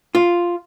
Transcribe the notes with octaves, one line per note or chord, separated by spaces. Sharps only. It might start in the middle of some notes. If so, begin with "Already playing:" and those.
F4